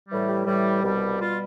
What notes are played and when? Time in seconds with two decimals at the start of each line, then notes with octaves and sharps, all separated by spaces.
0.09 A2 E3 G3
0.27 G4
0.46 A2 E3 G3
0.83 C2 B2 G3
1.20 B2 G3 F4